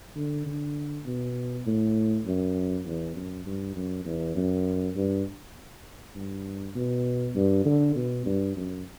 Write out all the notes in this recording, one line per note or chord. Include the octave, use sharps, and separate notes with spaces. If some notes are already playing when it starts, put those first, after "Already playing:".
D3
D3
B2
A2
F#2
E2
F#2
G2
F#2
E2
F#2
G2
G2
B2
G2
D3
B2
G2
F#2